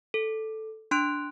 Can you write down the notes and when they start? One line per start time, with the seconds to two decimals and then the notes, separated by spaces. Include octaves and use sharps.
0.14 A4
0.91 D4 C6 F#6 D7